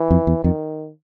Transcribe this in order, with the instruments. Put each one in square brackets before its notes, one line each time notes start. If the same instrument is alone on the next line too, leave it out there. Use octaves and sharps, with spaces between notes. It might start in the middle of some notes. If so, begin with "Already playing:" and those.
Already playing: [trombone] E3
[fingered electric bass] F2
E2
[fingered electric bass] F2 [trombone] D#3